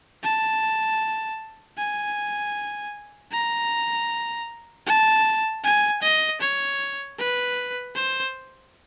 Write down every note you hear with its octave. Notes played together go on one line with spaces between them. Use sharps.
A5
G#5
A#5
A5
G#5
D#5
C#5
B4
C5